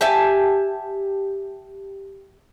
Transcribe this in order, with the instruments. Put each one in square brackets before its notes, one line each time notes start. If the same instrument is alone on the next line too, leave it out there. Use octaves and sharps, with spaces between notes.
[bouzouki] G4 E5 G#5 A5